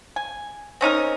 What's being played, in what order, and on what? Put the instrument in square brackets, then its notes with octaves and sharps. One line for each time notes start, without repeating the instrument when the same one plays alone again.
[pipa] G#5
C4 C#4 D#4 A#4